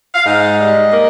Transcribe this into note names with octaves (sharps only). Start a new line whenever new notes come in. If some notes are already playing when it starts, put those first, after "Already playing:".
F5
G#2 D#5
G3
A#3